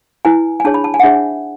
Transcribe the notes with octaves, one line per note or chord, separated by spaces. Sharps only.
E4 B4 G#5
G#5
D4 G#4 C#5 A5
B5
A5
G#5
F#5
D4 G#4 C#5 E5